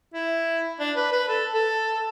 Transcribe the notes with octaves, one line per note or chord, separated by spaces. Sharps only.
E4
D4
B4
B4
A4
A4